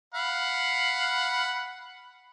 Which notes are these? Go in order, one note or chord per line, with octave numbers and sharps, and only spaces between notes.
F5 F#5 B5